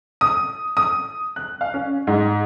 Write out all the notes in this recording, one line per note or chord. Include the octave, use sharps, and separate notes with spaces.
D#6
D#6
F#6
F5
C#4
G#2